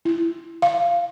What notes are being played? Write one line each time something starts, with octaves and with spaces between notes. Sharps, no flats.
E4
F5